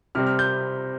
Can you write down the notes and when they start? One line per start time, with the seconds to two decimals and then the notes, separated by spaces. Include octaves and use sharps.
0.15 C3 G3 C4 F6
0.27 F6
0.39 G6